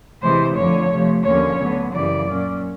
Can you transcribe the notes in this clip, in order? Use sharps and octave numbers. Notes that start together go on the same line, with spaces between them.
C3 E3 G#3 C5
F2 D3 F3 A3 C#5
C3 F3 A3
D#2 D3 F3 A#3 C#4 C#5
D2 D3 F#3 B3
F#2 C#3 E3 G3 D5
A#2 F#3 A#3 C#4